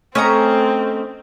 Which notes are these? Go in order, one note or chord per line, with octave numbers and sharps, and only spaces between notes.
A3 C4 C#4 C#5 D#5 A#5